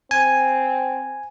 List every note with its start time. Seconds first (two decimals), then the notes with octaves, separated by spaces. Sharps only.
0.11 C4 G#5